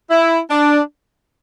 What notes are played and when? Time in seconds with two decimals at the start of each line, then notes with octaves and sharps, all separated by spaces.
0.11 E4
0.50 D4